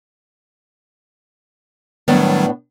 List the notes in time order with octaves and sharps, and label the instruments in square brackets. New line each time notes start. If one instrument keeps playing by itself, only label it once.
[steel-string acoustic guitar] A2 B3 D4 [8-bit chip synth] D#3 F#3 G3